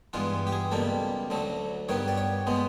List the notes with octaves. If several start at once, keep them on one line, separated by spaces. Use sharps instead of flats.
G2 E3 G#3 B3 F4
G4
G#4
C#2 B2 G3 A#3 A4
D2 D3 F#3 A3
G2 D#3 G3 B3 C#5
D5
C#5
B2 G#3 B3